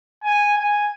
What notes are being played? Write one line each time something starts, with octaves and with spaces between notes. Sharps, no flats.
G#5
G#5